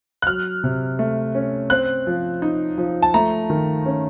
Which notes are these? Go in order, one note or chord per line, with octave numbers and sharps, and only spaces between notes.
F#6
F#3 F6
C3
A3
C#4
C4 F#6
F3
D#4
F3
A5
A3 A#5
D#3
C#4